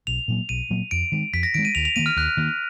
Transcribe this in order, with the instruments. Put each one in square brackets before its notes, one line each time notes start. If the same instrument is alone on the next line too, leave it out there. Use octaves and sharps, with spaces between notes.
[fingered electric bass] B1 [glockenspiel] F7
[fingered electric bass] A#2 F#3 A#3
[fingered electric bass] B1 [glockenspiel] D#7
[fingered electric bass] A#2 F#3 A#3
[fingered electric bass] F2 [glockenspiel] D7
[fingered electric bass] D#3 G#3
[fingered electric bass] F2 [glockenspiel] B6
[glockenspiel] A#6
[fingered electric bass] D#3 G#3 [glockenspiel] D7
[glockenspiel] D#7
[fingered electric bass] D#2 [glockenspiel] F7
[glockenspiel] F7
[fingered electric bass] D#3 A#3 [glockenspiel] D#7
[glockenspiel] F6
[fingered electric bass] D#2 [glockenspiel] F#6
[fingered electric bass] D#3 A#3